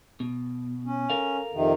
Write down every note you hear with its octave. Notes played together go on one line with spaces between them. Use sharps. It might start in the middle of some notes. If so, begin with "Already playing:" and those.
B2
C#4
A4 A#4 F5
F2 C3 D#3